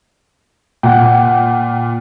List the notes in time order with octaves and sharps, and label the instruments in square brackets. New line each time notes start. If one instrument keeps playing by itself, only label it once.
[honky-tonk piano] A#2 [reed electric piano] F#5 G5